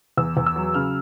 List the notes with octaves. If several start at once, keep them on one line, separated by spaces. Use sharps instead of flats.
E2 E6
E2
E6
F#3
C#3 F6